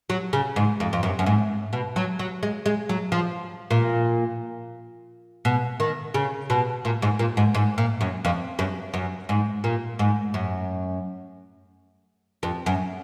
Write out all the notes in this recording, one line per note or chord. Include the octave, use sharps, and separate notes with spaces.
F#3
C#3
G#2
F2
F2
F#2
F#2
G#2
B2
F#3
F#3
G#3
G#3
F#3
F3
A#2
B2
D#3
C#3
B2
A#2
G#2
A#2
G#2
G#2
A#2
F#2
F2
F#2
F#2
G#2
A#2
G#2
F#2
F2
F#2